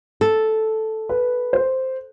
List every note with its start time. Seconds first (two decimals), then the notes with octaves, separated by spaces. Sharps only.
0.21 A4
1.09 B4
1.53 C5